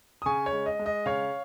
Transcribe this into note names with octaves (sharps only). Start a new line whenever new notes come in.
D#6
C#3 G#5 C#6
C#5
G#3
D#5
G#3
D#5
C#3 C#5 F5